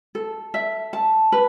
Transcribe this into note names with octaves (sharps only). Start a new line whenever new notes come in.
A4
E5
A5
B4